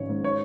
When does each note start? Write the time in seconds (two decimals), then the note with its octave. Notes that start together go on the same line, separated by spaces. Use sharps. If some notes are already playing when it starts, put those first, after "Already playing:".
Already playing: G#1 C#4 C#5
0.09 G#2
0.24 D#4 C#5